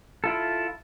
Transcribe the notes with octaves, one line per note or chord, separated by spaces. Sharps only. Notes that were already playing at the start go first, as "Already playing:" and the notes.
E4 F4 A4